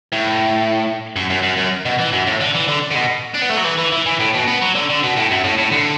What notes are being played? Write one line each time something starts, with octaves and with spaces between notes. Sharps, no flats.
A2
F#2
F#2
F#2
F#2
B2
E3
F#2
A2
D3
E3
D3
D3
B2
D4
B3
A3
F#3
E3
E3
E3
E3
A2
B2
B3
F#3
D3
D3
B2
A2
F#2
A2
A2
D3